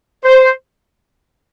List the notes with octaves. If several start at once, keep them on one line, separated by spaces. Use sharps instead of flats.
C5